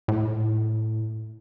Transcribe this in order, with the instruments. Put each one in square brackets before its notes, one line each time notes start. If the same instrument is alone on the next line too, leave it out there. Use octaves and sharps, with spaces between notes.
[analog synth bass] A2